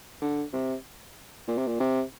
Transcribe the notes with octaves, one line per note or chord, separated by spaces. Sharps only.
D3
C3
A#2
C3
A#2
C3